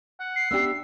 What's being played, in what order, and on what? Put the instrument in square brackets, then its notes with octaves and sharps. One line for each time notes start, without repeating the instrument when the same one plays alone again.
[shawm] F#5
[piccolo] C7
[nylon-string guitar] B3 D4 G4 [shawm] E5